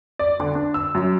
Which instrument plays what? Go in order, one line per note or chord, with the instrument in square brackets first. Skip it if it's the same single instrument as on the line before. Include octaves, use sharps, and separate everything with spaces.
[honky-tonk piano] D5
D3
D4
E6
F#2